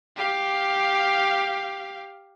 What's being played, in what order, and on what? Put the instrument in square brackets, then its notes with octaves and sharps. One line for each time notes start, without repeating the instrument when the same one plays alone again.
[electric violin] G4 F5